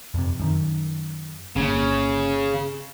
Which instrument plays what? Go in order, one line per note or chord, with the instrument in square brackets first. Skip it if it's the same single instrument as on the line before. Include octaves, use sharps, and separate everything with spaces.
[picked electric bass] F2 C3
F#2 D#3
[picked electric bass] G1 A#3 [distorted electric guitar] C#3